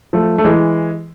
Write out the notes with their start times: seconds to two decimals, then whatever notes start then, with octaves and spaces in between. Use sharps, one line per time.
0.13 F3 A3
0.38 A3
0.44 E3 G#3